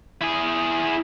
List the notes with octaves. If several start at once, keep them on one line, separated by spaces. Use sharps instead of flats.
E4 G#4